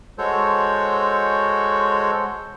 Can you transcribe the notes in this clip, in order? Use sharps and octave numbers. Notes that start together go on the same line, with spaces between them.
G#3 F#4 A4 C5 C#5